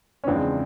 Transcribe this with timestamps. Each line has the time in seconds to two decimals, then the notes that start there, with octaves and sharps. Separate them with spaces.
0.24 C#4
0.27 E2 C#3 F3 G#3 C4 D4